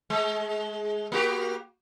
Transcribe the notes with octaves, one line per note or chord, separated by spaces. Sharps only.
G#3
A#3 F#4 G4